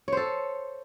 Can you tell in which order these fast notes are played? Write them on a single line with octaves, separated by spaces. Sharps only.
C#5 C5 A4